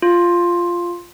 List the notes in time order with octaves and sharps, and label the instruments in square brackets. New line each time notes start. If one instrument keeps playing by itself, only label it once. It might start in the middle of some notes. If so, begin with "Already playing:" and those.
[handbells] F4